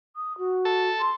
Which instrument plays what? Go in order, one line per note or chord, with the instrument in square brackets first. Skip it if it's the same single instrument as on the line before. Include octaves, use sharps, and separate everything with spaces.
[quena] D#6
F#4
[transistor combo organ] A4
[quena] C6